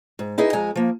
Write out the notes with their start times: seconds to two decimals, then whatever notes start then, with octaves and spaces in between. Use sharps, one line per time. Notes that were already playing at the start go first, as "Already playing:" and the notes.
0.19 G#2
0.38 D#4 E4 G#4 B4 D#5
0.53 F2 G#3 G#5 A#5
0.76 F3 A#3